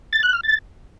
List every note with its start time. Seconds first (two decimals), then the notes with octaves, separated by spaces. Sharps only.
0.13 A6
0.23 F#6
0.33 F6
0.43 A6